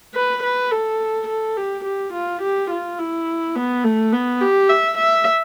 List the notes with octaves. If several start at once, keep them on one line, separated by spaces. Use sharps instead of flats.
B4
B4
A4
A4
G4
G4
F4
G4
F4
E4
B3
A3
B3
G4
E5
E5